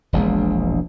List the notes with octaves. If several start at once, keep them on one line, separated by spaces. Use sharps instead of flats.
E1 A#1 B2 G#3